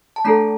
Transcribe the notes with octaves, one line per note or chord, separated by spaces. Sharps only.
A5
A3 D4 A4 A#5